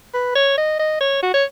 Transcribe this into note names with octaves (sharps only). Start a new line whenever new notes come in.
B4
C#5
D#5
D#5
C#5
F#4
C#5